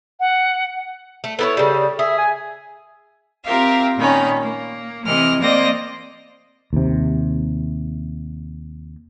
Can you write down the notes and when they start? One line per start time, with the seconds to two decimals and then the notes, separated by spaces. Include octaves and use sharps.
0.20 F#5
1.24 A3
1.39 B3 E4 A4 C#5
1.57 C#3 G3
1.99 G#4 E5
2.18 G#5
3.44 C4 F4 G4 A#4 E5 F5
3.98 A#2 D#3 C#4 B5
4.43 A#3
5.06 C3 E3 A#4 D#5 F6
5.41 A#3 C4 C5 D5 D#5 A#6
6.73 D#2 C3